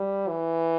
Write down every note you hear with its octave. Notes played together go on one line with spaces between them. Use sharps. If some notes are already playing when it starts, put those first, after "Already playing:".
Already playing: G3
E3